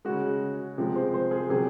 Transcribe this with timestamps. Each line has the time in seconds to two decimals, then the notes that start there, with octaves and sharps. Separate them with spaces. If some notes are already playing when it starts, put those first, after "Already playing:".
0.05 C#3 G#3 F#4
0.78 C3 F3 G#3
0.96 C5
1.14 C5
1.31 G#4
1.49 C3 F#3 G#4